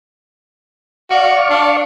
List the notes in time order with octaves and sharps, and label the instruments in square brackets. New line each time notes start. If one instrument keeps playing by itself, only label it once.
[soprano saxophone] F#4 [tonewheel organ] D5 F5 C#6
[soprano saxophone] D4